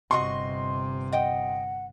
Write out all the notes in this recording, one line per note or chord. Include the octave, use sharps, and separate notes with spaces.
G1 C3 F#4 D#5 C6 C#6
D#5 F#5 G5 D#6